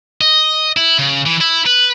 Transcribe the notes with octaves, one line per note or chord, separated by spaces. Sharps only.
D#5
E4
C#3
E3
E4
B4